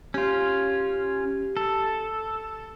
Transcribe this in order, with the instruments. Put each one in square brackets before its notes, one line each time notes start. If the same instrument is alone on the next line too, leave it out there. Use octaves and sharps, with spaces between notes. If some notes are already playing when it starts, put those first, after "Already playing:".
[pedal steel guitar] C#4 F4 [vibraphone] G4
[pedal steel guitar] A4